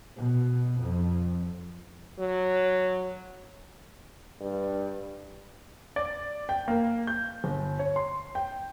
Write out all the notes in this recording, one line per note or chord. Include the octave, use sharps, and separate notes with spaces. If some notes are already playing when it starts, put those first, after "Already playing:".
B2
F2
F#3
G2
D5
G5
A#3
G6
G1
C#5
C6
G5